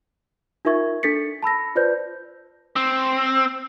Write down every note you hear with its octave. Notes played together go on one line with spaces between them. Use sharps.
D#4 F4 A#4 E5 C#6 G#6
D4 A4 A6 B6 C#7
A5 B5 E6 A#6
F4 B4 C5 D5 G6
C4